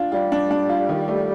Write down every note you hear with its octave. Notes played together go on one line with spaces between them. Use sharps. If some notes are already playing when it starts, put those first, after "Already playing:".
Already playing: D4 F4
G3 F4
D4
D4
F4
D#3
A3